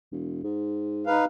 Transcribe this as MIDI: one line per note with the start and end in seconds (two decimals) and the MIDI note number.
0.12 0.42 28
0.44 1.14 44
1.07 1.25 63
1.07 1.25 71
1.07 1.25 77